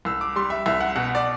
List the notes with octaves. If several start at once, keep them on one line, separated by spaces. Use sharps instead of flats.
C2 E6
D6
G3 C6
E5
C2 E5
F#5
B2 F#5
D5